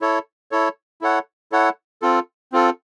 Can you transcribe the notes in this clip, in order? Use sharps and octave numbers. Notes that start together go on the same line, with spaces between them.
E4 A4 C#5
E4 A4 C#5
E4 A4 C#5 F#5
E4 A4 C#5 F#5
C4 F4 A4
C4 F4 A4